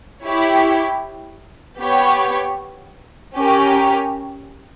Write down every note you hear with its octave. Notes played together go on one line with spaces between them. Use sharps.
E4 G4 C#5
B3 G4 C#5
C#4 G4 A#4